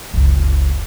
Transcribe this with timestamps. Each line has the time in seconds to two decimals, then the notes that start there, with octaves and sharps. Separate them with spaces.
0.14 F#1 C#2